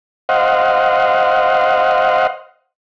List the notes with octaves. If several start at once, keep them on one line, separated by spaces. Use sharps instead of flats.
C5 D#5 F5 F#5